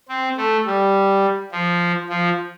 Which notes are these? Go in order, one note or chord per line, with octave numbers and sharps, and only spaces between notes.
C4
A3
G3
F3
F3